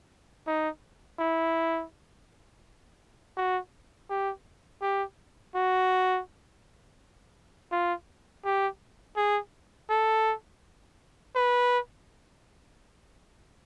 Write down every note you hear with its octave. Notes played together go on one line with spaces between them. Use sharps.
D#4
E4
F#4
G4
G4
F#4
F4
G4
G#4
A4
B4